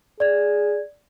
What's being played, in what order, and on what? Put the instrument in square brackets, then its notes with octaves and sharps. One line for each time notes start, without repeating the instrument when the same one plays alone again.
[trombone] G#4 [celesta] D5 G#6